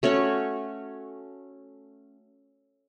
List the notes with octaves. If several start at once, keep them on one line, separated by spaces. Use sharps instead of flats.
A3 C#4 F#4 C#5